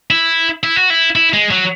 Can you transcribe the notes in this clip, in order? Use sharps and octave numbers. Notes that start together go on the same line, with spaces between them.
E4
E4
F#4
E4
E4
G#3
F#3